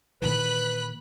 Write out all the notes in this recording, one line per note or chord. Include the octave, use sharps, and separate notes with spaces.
A#2 D#3 E3 B4 B5 F#6